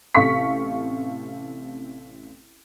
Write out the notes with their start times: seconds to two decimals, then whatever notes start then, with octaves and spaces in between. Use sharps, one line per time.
0.15 A1 C3 A4 F5 C#6 B6